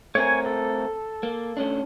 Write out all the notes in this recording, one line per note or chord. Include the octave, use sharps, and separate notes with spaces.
A3 C4 A#4 C#5 G#5
A4
A#3
A3 C#4 D4